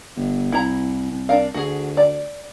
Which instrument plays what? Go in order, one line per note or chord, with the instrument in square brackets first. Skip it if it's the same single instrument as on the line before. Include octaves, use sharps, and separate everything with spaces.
[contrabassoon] G1
[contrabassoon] C2 [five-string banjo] E4 A#5
[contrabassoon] C2
[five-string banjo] D4 A#4 F5
[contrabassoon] D2 [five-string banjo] F#4 G#4
[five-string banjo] D5